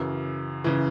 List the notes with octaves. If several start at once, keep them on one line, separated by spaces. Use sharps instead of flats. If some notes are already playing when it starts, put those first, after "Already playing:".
Already playing: F#2 C#3 E3
C#3 E3